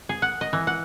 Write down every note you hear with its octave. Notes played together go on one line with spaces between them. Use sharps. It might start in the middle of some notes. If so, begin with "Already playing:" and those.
G#4
F#5
D#5
E3
F#5